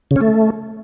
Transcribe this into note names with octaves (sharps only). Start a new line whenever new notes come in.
C#3
C#4
A3